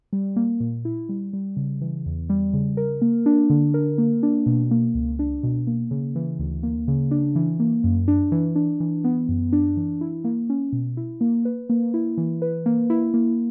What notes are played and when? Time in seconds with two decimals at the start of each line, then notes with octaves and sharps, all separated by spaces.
0.13 G3
0.36 A#3
0.60 A#2
0.85 E4
1.09 G3
1.33 G3
1.57 C#3
1.81 E3
2.06 E2
2.29 G3
2.53 C#3
2.77 A#4
3.02 A#3
3.26 D4
3.50 D3
3.74 A#4
3.98 A#3
4.23 D4
4.46 B2
4.71 A#3
4.95 C#2
5.19 D4
5.43 B2
5.67 A#3
5.91 C#3
6.15 E3
6.39 D2
6.63 A#3
6.88 C#3
7.11 D4
7.36 E3
7.60 A#3
7.84 F#2
8.08 D4
8.32 E3
8.56 D4
8.80 E3
9.04 B3
9.29 F#2
9.52 D4
9.77 E3
10.01 E4
10.24 A#3
10.50 C#4
10.72 B2
10.97 E4
11.21 A#3
11.45 B4
11.70 A#3
11.94 E4
12.17 E3
12.42 B4
12.66 A#3
12.90 E4
13.14 A#3